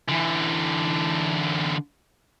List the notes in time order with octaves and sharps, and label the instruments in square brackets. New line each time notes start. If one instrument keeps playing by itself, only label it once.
[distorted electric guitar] D3 E3